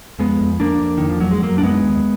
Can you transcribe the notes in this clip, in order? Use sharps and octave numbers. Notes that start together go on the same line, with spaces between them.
F2 G#3 B3
F2
F2 A#3 D4
F2
F2 D#3
F3
F2 F#3
G#3
F#2 F#3 A#3
D4
F#2 G#3 B3
D#2